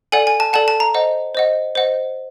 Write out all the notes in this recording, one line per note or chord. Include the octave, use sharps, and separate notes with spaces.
A4 D5 F#5 G#5
G#5
A5
A4 D5 F#5 A5
A5
A#5
C5 D#5 F#5
C5 D#5 F#5
C5 D#5 F#5